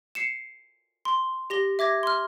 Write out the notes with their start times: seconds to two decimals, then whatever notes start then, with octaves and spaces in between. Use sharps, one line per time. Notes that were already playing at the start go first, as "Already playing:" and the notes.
0.15 C7 C#7 E7
1.05 C6
1.50 G4 A#6 G7
1.79 E5 D6 G#6 A#6
2.03 C6 F6